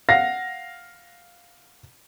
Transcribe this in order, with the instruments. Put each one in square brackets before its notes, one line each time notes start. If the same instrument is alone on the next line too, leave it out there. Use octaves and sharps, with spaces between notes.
[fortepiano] F5 F#5 [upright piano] A#6